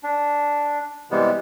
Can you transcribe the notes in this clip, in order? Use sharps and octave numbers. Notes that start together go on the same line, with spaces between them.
D4
C3 E3 G3 G#3 B3